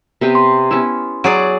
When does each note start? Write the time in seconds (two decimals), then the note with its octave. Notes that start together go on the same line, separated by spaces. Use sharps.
0.21 C3 B3 G5
0.35 C6
0.71 B3 C#4 E4
1.24 F#3 G#4 D5